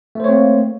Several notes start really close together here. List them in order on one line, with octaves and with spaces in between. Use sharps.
A3 C5 C#5 C4 A#3